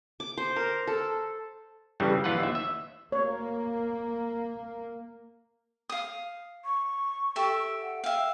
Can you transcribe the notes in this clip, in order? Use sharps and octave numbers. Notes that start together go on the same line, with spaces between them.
D6
C5
A#4
A4
G1 G2 C#3 E3 G3
A#1 E3 F4 B4 F#5
D#2 E5
E5
A#3 C#5
F5 D#6
C#6
G4 A4 E5
F#5
E5 F5 G5